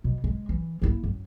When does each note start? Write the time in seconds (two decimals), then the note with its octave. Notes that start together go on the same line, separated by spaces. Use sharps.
0.04 B2
0.24 G#3
0.49 E3
0.82 A#3 E4
1.03 F#2